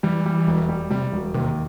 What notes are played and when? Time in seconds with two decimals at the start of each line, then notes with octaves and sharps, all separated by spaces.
0.03 E3 G3
0.26 G3
0.47 E1
0.69 G3
0.90 C3 G3
1.13 E1
1.34 D#2 C3